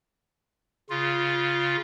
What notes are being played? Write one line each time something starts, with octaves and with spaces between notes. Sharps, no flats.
C#3 F4